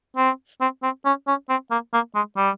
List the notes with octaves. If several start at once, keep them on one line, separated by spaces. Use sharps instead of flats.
C4
C4
C4
C#4
C#4
C4
A#3
A#3
G#3
G3